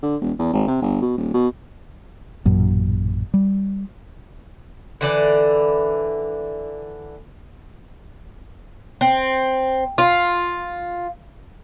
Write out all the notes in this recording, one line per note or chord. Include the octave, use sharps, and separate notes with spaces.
D3
E1
E2
G#1
C3
G1
B2
D#1
B2
A1 F#2 A#2
G3
D3 E3 D5
C4
F4